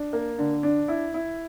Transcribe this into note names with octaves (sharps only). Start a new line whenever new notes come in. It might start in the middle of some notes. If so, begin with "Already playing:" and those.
Already playing: D4
A#3
D3
D4
E4
E4